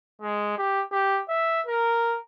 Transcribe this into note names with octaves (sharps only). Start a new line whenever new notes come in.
G#3
G4
G4
E5
A#4